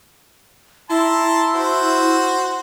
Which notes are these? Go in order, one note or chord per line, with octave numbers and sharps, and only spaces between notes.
E4 A5 A#5 C6
F#4 C5